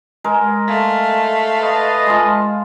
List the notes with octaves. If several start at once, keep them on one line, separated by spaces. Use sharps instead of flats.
G#3 A#4
A3 F5
B4 D#5 A5
G#3 F4